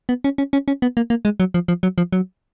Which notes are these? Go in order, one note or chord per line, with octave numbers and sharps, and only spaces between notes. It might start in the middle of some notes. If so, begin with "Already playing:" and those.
B3
C#4
C#4
C#4
C#4
B3
A#3
A#3
G#3
F#3
F3
F3
F#3
F3
F#3